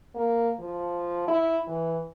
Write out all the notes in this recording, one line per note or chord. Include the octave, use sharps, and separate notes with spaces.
A#3
F3
E4
E3